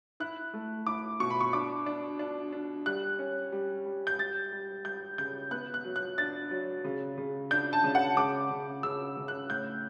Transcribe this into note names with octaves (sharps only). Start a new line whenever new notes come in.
E4 F#6
A3
E4 D6
B2 C#6
B5
C#6
D4 D6
D4
D4
D4
G3 F#6
C#4
G3
G3
G6
G3 A6
G3
G3 G6
C#3 G6
B3 F#6
F#6
F#3
F#6
D4 A6
F#3
C#3
C#3
D4 G6
A5
C#3
F#5
C#3 D6
C#3
C#3 E6
C#3
F#6
A2 G6